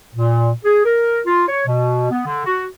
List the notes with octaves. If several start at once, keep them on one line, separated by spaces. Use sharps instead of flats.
A#2
G#4
A#4
F4
C#5
B2
B3
D3
F#4